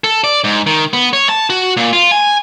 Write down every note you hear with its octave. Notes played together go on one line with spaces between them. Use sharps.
A4
D5
G#2
D#3
B3
C#5
A5
F#4
A#2
F4
G#5